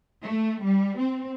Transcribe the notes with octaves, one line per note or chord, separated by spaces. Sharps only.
A3
G3
C4